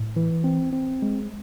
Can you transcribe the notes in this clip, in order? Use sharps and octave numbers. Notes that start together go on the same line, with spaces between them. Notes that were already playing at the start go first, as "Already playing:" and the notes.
Already playing: A2
E3
C4
C4
G#3